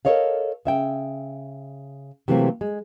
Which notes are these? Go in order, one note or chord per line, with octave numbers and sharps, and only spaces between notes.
A4 A#4 C#5 D#5 F5
C#3 E5 G5
C3 E3 F#3 A3 A#3 C4
G#3